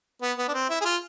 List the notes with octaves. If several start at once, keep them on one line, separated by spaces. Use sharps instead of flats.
B3
B3
D4
C4
E4
G#4
F4